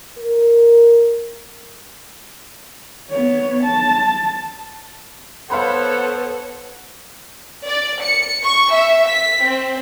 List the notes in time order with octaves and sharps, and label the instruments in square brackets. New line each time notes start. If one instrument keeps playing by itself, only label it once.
[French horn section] A#4
[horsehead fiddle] B3 C#5
A5
[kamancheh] B3 C5 [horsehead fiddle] A4 C#5 [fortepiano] F5 B5 C6 [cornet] F#5
[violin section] D5
C#7
C#6
E5
B6
C4